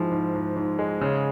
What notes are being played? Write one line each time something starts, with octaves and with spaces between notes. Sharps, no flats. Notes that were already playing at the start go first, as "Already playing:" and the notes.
Already playing: G#2 F3 G#3 E4
G#2
G#2
G#2
G#3
C#3